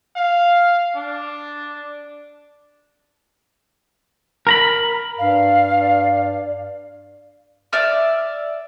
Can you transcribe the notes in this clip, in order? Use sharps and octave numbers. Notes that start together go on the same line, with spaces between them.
F5
D4
A#4 A#5 B5
G2 D5 F5
D5 E5 F6